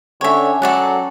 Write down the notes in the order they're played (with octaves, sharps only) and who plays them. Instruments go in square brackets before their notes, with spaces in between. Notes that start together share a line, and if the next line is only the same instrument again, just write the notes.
[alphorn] D3 [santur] C#4 G5 [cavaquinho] C#5 E5
[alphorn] F#3 [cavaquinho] A4 D5 F#5